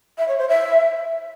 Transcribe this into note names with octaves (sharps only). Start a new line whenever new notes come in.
E5
C#5
C5
E5